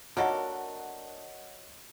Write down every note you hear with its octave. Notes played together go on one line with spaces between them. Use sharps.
D3 A#3 F#4 A4 A#4 C#5 D#5 F#5